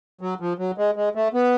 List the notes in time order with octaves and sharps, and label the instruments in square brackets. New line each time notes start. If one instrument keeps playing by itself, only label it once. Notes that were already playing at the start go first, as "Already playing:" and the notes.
[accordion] F#3
F3
F#3
G#3
G#3
A3
B3